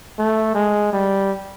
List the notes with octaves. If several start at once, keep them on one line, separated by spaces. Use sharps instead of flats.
A3
G#3
G3